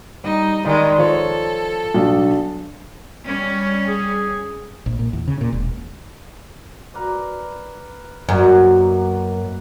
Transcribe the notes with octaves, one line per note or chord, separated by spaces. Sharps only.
G3 D#4
D#3 G3 G#3 D#5
F3 A4 C#5
B1 D4
G3 C#4
G#4
A#1
A#2
E2
C#3
A#2
E1
A#4 B4 D5
F#2 B2 A#3 F#4